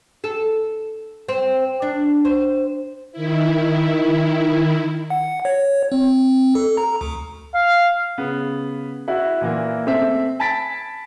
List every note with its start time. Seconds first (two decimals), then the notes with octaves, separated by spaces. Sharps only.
0.24 A4
1.29 C4
1.82 D4
2.25 C5
3.12 D#3 E4
5.10 F#5
5.45 C#5
5.92 C4
6.55 A4
6.77 A#5
7.01 D2
7.54 F5
8.18 C#3 B3
9.08 E4 F#4
9.41 A#2 E3 A#3
9.86 A3 C4 E5
10.39 G#5 A5 B5 A6 B6 D7